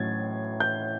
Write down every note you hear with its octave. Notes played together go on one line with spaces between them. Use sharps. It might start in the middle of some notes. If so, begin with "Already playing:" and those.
Already playing: A2 F#3 C#4 G#6 A6
G6